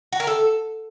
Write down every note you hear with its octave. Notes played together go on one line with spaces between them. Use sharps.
F#4
A#4
A4